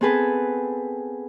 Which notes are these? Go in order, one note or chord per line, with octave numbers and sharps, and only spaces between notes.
B3 C4 G#4 A4 B4